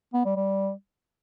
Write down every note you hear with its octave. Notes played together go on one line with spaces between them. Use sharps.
B3
G3
G3